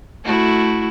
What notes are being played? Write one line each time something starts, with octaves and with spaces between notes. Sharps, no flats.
A3 E4 F#4